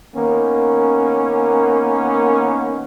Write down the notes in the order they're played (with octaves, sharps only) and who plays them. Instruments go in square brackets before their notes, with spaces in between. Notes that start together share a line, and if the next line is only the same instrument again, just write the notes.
[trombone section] D#3 A#3 B3 C#4